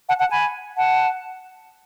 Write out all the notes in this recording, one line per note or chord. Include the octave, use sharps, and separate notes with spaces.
F#5 A5
F#5 A5
G#5 B5
F#5 A5